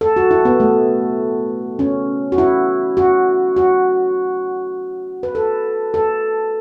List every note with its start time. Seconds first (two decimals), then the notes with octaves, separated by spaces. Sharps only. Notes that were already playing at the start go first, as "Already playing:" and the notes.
0.01 A4
0.16 F#4
0.31 E4
0.45 B3
0.60 A3
1.79 C#4
2.32 F#4
2.38 E4
2.97 F#4
3.56 F#4
5.23 B4
5.35 A4
5.94 A4